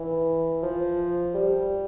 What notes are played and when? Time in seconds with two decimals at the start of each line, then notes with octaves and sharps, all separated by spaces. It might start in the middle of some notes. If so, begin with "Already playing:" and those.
Already playing: E3
0.63 F3
1.34 G3